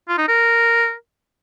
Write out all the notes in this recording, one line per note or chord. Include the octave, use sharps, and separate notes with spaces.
F4
D#4
A#4